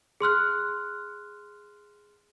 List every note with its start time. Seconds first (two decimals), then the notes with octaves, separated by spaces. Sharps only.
0.20 G#4 C6 F6 F#6